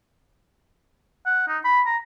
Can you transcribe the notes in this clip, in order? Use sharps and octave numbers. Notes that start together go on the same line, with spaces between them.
F#5
D#4
B5
A#5